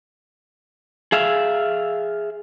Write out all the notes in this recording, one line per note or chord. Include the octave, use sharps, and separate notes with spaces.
G#4 E5 F5